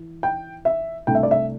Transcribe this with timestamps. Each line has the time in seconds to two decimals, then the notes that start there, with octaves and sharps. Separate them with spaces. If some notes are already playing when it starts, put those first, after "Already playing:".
Already playing: E3
0.23 G5
0.65 E5
1.07 C2 C3 A3 D4 G5
1.15 E5
1.23 D5
1.31 E5